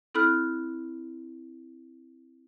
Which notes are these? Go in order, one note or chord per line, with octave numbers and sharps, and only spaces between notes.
C4 E4 A4 B5 F6 F#6